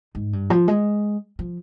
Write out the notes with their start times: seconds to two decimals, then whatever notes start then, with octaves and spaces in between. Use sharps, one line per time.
0.15 G#2
0.33 G2
0.50 F3
0.68 G#3
1.39 F3